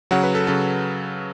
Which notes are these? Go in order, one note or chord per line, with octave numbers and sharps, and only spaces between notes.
C#3 F#3 F#5
B4
A4
C#3 F#3 A4